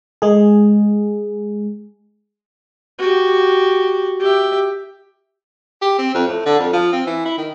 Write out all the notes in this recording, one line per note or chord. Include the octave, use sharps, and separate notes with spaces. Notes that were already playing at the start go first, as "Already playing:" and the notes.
G#3 G#4
F#4 G4
G4 E5
G4
C4
F2
A2
D3
F2
F3
C4
E3
E4
D#3